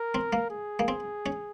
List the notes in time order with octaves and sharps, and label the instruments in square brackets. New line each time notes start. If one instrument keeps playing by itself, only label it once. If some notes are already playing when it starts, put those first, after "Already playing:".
Already playing: [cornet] A#4
[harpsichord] C4
A#3
[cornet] G#4
[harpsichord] A#3
C4
C#4